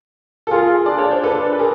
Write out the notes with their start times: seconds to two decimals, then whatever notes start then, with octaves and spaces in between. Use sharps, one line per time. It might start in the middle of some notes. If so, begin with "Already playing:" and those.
0.47 A4
0.51 F4 G#4 A#4
0.86 D4 D5
0.98 C#5
1.11 C5
1.23 D4 A4 B4
1.53 B4
1.59 G#4 A#4